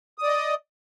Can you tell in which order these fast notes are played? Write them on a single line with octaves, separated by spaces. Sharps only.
D#6 D5 D#5